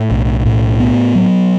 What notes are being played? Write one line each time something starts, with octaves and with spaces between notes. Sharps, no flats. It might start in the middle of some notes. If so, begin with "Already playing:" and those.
Already playing: A2
B1
A2
B3
F#3